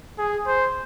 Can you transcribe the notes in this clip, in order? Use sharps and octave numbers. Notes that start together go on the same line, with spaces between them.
G#4
C5